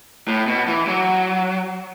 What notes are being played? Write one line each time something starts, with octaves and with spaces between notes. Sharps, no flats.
A2
B2
E3
F#3